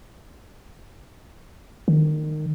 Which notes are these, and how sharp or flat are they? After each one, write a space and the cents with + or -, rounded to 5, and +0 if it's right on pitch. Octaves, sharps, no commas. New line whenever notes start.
D#3 -25